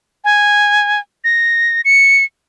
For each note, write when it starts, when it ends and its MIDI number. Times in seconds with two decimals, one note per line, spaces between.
0.24 1.00 80
1.24 1.81 94
1.85 2.24 97